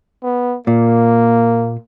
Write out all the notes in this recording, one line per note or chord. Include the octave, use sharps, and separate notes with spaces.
B3
A#2 A#3